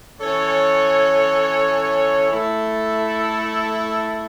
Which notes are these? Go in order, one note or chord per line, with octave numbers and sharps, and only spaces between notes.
E3 C#4 A4 C#5
A3 E4 A4